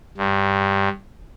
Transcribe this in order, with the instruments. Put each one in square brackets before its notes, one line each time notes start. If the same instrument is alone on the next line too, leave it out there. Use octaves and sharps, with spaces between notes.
[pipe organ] G2